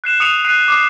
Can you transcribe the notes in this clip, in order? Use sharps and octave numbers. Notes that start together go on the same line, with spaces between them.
F#6 C7 E7
D#6 C#7 D#7 F7
F#6 C7 D#7
D6 D#6 C7